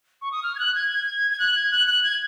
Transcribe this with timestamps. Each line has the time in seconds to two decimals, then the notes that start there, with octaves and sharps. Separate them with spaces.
0.22 C#6
0.32 D#6
0.43 F6
0.55 G#6
0.59 F#6
0.75 G#6
0.92 G#6
1.31 G#6
1.39 F#6
1.56 G#6
1.71 F#6
1.87 F#6
2.03 G#6